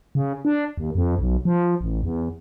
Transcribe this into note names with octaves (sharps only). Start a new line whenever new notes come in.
C#3
D4
D#2
F2
B1
F3
A1
E2